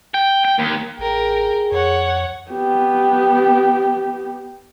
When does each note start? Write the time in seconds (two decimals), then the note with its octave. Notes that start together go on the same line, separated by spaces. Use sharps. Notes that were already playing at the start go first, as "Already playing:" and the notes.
0.14 G5
0.45 G5
0.59 D#2
0.99 A1 G#4 A#4 G5
1.72 F2 C#5 F#5
2.51 B3 G4